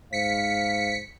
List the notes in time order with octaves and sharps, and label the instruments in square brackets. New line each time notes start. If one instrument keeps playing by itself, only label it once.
[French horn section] G#2 C5 [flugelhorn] F5 [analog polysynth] B6 C#7